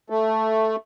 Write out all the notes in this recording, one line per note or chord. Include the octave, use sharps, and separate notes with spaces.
A3